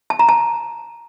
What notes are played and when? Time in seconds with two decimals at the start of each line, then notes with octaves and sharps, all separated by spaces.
0.10 A5
0.19 A#5
0.29 A5